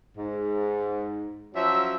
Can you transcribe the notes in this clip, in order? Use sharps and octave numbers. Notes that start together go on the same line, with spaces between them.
G#2
F3 F#3 C#4 E5